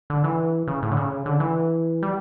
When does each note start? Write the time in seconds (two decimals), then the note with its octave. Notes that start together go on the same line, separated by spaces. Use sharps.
0.10 D3
0.24 E3
0.68 C#3
0.83 A2
0.91 D3
0.97 C#3
1.26 D3
1.40 E3
2.03 G3